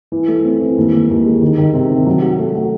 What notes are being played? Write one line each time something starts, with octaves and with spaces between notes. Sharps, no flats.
E3
A3
C4
E3
D#2
D#2
D#2
G#3
D#3
D#3
C3
D#3
F#3
F#4
A3
F#4